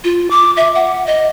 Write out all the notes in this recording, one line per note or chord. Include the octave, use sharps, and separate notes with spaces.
F4
D6
E5
F#5
D#5